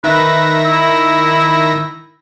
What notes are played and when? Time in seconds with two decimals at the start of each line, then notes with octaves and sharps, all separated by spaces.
0.04 D#3 B4 E5 A#6
0.65 E4